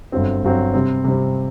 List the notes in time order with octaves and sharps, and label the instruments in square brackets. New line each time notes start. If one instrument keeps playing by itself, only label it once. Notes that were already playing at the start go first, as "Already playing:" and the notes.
[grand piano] G1 G2 F#3 C4
G1 G2 F#3 C4
C3 G3 C4
C3 G3 C4